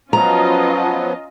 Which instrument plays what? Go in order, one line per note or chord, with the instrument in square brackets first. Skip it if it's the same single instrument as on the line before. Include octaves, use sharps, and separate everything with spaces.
[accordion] F3 F#3 B3 [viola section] C#4 F4 D#5 [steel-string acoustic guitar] A#5